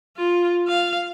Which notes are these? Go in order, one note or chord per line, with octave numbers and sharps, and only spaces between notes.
F4
F5